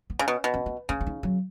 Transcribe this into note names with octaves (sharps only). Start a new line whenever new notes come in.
B3
C#3 C#4
B2
B2
C#4
C#4
C#3 C#4
C#4
D#4
F#3